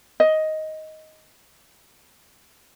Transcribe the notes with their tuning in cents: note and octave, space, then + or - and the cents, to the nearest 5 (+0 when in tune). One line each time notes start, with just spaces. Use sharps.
D#5 +10